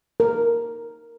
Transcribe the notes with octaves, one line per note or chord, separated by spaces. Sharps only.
A#4